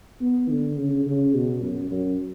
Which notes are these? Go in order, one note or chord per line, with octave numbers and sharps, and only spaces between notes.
B3
D3
C#3
C#3
B2
F#2
F#2